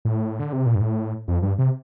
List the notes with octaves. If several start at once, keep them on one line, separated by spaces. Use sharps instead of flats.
A2
D3
C3
A#2
G2
A2
F2
G2
C3